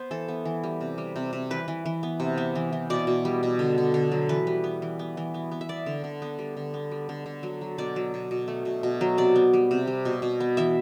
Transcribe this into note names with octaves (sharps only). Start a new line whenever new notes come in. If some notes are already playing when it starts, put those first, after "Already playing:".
Already playing: B3 C5
E3 A4
B3
E3
G3
C3
G3
C3
C3
E3 B4
E3
E3
B3
C3
B3
E3
E3
B2 D5
B2
G3
B2
D3
D3
D3
F#3
E3 B4
G3
B3
E3
B3
E3
B3
B3
E5
B3 D5
D3
D3
B3
G3
D3
B3
G3
D3
D3
F#3
F#3
B2 D5
F#3
B2
B2
A3
B2
B2
F#3
C3 D5
B3
G3
C3
G3
B2
B2
B3
E3 E5